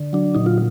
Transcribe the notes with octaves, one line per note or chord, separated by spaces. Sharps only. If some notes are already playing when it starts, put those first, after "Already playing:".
Already playing: D3
F#3 D4
A#2 D#4
F4